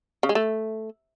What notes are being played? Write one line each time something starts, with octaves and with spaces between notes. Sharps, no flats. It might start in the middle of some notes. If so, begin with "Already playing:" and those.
C#3
G#3
A3